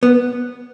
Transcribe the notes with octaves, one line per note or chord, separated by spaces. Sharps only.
B3